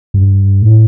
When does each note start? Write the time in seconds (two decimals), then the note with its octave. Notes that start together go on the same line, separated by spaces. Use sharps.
0.14 G2
0.62 A2